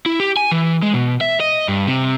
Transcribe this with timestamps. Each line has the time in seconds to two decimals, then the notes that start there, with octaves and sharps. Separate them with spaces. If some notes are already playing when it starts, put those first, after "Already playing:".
0.06 E4
0.20 G4
0.37 G#5
0.51 E3
0.82 G#3
0.94 B2
1.21 E5
1.40 D#5
1.68 G2
1.87 C3